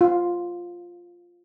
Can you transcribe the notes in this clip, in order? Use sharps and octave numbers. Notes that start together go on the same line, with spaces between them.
F4